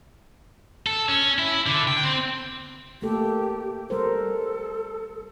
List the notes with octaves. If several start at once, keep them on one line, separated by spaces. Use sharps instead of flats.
A4
C#4
E4
D3
G5
C4
A3 A#3 G4 A4
G3 A4 A#4 C5